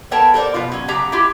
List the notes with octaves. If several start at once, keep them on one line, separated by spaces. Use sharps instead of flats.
B3 A4 A#4 C#5 G5 A5
A4 A#4 C5 D5
B2 F3 F4
F#3 C#4
C#3 F#3 G4 A#5
E4 F4 G4